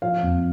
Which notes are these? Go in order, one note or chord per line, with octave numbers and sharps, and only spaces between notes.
F3 F5
F2